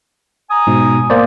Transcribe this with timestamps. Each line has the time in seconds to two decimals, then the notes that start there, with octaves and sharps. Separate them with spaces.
0.49 G#5 A#5 D#6
0.67 G#2 B2
1.10 A#3 B3 C5 D5